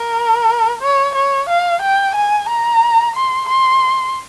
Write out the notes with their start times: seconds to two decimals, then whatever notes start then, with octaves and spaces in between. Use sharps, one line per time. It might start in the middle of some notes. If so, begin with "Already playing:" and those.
Already playing: A#4
0.82 C#5
1.15 C#5
1.49 F5
1.82 G5
2.15 G#5
2.49 A#5
3.16 C6
3.49 C6